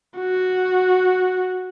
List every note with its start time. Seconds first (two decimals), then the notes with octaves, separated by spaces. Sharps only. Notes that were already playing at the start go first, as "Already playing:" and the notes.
0.19 F#4